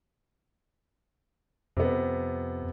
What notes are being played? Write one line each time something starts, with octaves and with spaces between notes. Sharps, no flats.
F2 C3 B3